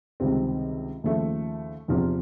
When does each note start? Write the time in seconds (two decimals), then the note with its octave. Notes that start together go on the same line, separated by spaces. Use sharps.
0.20 C#2 C3 D#3 G3 C4
1.04 D#2 C#3 F3 A3
1.88 E2 C3 F3